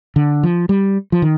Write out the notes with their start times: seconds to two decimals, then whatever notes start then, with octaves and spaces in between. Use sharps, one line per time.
0.16 D3
0.43 F3
0.69 G3
1.12 F3
1.22 D#3